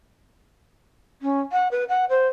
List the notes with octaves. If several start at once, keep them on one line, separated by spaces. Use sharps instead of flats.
C#4
F#5
B4
F#5
C5